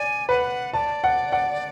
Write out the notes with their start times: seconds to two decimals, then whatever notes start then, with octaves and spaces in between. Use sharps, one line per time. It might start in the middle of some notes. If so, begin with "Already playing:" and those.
Already playing: D5 G#5
0.29 B4 F#5
0.74 D5 A5
1.04 F#5
1.32 F#5